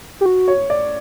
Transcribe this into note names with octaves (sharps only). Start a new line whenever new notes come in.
G4
F#4
C#5
D5